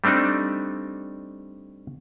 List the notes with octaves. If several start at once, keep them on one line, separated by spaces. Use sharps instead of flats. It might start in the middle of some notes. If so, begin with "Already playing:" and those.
G3 A3 C4 D4 D#4